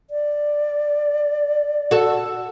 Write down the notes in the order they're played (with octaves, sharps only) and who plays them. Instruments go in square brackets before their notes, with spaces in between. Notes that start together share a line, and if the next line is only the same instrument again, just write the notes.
[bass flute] D5
[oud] F#4 A4